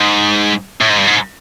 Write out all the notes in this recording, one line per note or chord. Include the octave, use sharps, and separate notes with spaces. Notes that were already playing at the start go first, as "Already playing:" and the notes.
Already playing: G#2
A2
G#2
G2
G#2